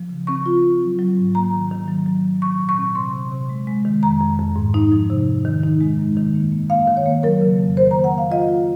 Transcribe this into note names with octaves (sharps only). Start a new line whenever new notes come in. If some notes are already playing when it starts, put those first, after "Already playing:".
Already playing: F3
C#3
C4 C#6
F4
C4
F#3
F#3
G#2
A#3 A#5
D#3
D#3
F#3
F#3
F#3
F#3 C#6
A#2
C#6
C4
C3 C6
C3
C3
G#3
G#3
D#3
F2 A#5
F2
F2
G#2
D#4
F3
C3
C3
D#3
D#4
G#3
F#2
D#3
A#3
A#3
A#3 F5
D#3
C#5
A#3
F#3 A#4
C#3
F2
D#3 C5
A#3 A#5
F#5
A#3 F5
F4 D#5
F4